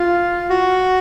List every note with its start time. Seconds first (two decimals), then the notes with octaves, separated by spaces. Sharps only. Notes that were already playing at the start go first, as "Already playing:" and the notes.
Already playing: F4
0.50 F#4